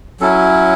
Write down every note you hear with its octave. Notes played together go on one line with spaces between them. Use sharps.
F#3 C#4 E4 A4